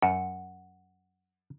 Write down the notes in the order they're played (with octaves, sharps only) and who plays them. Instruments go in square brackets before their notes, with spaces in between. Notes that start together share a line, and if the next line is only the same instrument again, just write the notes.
[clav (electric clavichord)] F#2 [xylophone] F#5